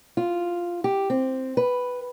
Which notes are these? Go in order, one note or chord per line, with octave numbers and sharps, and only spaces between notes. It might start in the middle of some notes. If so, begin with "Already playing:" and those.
F4
G4
C4
B4